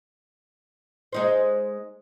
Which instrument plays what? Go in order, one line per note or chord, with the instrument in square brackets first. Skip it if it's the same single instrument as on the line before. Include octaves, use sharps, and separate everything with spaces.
[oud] G#3 D#4 C5